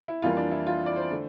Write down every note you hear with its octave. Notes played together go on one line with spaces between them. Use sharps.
E4
F2 E3 G3 A#3 F4
D4
E4
F4
D5
C5
D3 A3